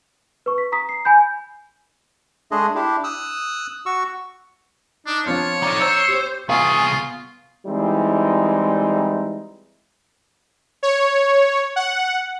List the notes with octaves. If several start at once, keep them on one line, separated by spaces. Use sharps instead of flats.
B4 C#6
B6
A#5 D#6 B6
C7
G#5 B5 G6
G#3 A3 D4 G#4 D#5
D4 E4 G4
D#6 E6 F#6
F#4 C#6 E6
D4 D#4
F3 C4 D4 F4 C#5
D#4 A4 D5
C5 E6
G4
C2 B3 F4 G#4 F5 G#5 C#6
E3 G3 G#3 C4 D#4 E4
C#5
F#5